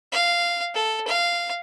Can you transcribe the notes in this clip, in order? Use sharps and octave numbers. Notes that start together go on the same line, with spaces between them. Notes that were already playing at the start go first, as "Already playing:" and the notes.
F5
A4
F5